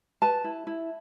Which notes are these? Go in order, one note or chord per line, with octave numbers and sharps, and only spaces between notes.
B4 A5
E4
E4